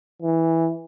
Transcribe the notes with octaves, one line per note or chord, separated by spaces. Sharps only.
E3